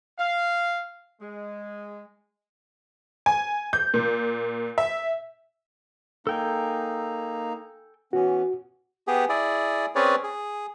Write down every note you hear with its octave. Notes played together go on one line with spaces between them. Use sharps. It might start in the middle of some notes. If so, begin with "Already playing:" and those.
F5
G#3
G#5
G6
A#2
E5
A#3 D#4 A4 G5 G#5
E3 B3 C#4 F#4
B3 G4 G#4
E4 G#4 D5
C4 C#4 G#4 B4 C#5 D5
G#4